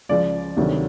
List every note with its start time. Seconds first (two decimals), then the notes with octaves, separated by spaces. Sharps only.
0.09 C#2 C#3 F3 D5
0.57 D2 C3 D#3 F#3